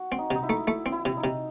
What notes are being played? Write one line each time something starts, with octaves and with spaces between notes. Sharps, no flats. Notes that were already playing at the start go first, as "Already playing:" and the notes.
Already playing: F#4
C4
D#4
C3
D#4
E4
A3
A3 E4
C4
E4
C3
D#4
C3